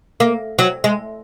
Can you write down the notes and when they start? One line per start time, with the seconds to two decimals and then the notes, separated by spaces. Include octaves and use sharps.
0.20 A#3
0.59 F#3
0.84 G#3